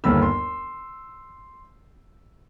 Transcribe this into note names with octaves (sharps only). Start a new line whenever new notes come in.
G1 D#2 B3 B5 E6
C6